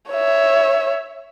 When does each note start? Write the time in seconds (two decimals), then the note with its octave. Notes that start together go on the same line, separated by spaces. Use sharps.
0.11 C#5 E5